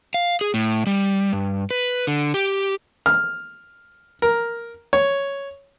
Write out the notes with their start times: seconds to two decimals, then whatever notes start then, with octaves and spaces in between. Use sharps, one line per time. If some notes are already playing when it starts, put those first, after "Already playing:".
0.14 F5
0.41 G#4
0.54 A2
0.87 G3
1.33 G2
1.71 B4
2.07 D3
2.34 G4
3.06 F6
4.22 A#4
4.93 C#5